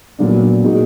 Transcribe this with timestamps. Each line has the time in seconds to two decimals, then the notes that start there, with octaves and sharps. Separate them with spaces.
0.19 A#2 F#3 B3 D4
0.64 A#2 G#3 D#4 F#4